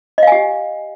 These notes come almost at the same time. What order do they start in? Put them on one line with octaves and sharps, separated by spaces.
D#5 F5 G#5 G4